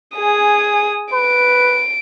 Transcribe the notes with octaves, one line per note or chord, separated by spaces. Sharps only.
G#4 G#5 D#6
B4 D7